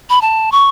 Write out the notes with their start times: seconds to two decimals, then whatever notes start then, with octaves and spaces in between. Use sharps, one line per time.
0.10 B5
0.22 A5
0.52 C#6